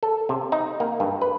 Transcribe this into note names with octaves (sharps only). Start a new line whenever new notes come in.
A4
C3
D#4
A#3
G2
B4